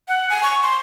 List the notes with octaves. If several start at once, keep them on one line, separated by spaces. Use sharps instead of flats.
F#5
G#5
C#6
C6